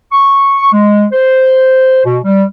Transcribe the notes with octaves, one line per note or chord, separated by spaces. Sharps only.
C#6
G#3
C5
B2
G3